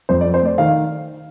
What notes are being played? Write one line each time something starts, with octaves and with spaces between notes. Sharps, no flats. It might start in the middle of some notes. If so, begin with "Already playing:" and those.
F2 C5
D5
C4
C5
A3 D5
D#3 F5